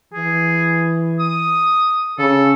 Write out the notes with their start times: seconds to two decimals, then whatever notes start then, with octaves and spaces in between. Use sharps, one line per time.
0.13 E3 G#4
1.19 D#6
2.19 C#3 A4